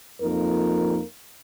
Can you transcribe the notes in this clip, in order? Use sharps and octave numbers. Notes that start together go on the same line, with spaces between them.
F2 F3 A#3 D#4 A#4